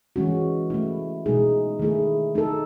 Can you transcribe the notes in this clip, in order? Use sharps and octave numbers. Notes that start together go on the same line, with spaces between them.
E3 G#3 C#4 F#4
A3 C#4 E4
B2 G#3 D#4 G#4
D#3 A3 E4 G#4
A3 D#4 A4